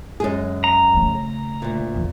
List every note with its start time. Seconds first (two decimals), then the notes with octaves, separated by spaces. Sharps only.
0.20 F#2 G#3 G#4
0.64 A#5
0.94 C#3 A3
1.62 D2 A#2
1.94 E2 C#3